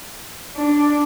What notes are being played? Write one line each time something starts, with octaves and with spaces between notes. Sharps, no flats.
D4